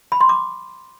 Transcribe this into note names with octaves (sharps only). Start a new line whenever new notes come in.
B5
C6
D6